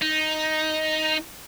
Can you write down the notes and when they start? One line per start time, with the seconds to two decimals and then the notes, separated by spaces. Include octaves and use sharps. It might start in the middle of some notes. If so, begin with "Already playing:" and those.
0.01 D#4